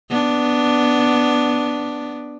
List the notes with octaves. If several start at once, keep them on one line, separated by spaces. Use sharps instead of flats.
B3 D4